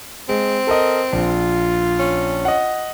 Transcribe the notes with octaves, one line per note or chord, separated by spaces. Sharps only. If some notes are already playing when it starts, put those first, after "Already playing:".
G#3 C4
A4 A#4 D#5
A#1 F4
C#4
D#5 F#5